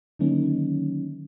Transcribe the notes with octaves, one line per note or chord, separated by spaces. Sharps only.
D3 D#3 F#3 A#3 C#4 D#4